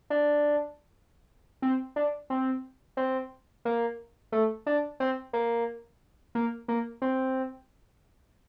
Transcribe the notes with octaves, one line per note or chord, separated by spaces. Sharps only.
D4
C4
D4
C4
C4
A#3
A3
D4
C4
A#3
A#3
A#3
C4